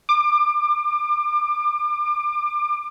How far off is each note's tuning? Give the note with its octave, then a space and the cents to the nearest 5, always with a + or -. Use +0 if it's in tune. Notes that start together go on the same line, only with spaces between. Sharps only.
D6 +25